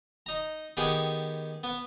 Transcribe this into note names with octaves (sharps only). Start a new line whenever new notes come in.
D#4 A#5
D#3 B3 G4 G#4 C#6
B3